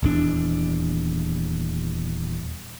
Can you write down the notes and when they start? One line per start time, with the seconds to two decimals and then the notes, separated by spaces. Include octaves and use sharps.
0.03 D#1 E2 D4